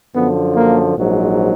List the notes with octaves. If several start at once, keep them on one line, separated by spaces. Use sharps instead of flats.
F#2 D3 F3 B3
A#3
A#1 G#2 F#3